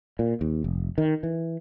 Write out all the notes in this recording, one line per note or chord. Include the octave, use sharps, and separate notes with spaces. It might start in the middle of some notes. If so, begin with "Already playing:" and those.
A#2
D#2
F1
D#3
E3